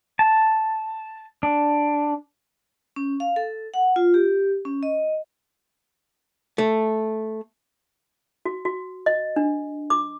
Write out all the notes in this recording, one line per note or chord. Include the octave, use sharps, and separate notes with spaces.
A5
D4
C#4
F5
A4
F#5
F4
G4
C#4
D#5
A3
F#4
F#4
D#5
D4
D6